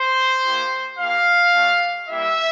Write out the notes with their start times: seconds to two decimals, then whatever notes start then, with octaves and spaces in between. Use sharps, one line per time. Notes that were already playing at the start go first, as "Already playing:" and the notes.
Already playing: C5
0.43 A#3 E4 G4
0.98 A#3 E4 G4 F5
1.53 A3 D4 G4
2.08 G3 A#3 E4 G4 E5